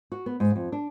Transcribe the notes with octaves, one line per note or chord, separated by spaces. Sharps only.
F#4
B3
G#2
F2
D4